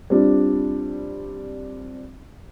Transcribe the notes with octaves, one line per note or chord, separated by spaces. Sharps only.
G3 C4 D4 F4